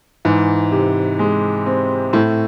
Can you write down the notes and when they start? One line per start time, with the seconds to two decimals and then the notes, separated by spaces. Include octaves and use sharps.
0.25 G#2 E3
0.72 C3
1.19 G#3
1.66 C4
2.13 A2 A3